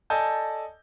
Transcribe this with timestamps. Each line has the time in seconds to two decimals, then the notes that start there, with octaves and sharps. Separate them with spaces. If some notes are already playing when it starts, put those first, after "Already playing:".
0.10 A4 D5 D#5 G#5 A5 G6